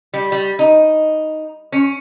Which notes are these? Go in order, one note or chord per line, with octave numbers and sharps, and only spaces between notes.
G3
G3
D#4
C#4